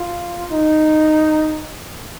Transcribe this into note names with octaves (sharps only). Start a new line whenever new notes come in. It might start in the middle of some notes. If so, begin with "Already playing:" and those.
Already playing: F4
D#4